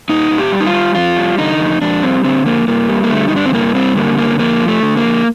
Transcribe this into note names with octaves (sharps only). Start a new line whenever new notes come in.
A#2 D#4
A#2
G4
G3
D#4
F4
G3
F2 F4
G3
D3 D#4
F2
F2 D4
G3 C4
D3 C4
F2 A#3
G2 A#3
G3
A#3
D3 A3
D#4
G2 D4
C4
G2 A#3
G3 C4
D3 A#3
G2 A#3
F2 A#3
F3
A3
D3
A#3
F2